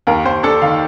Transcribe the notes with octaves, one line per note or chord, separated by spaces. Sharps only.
D#2 A#4
D#2 C5
D4 A4
D#3 F5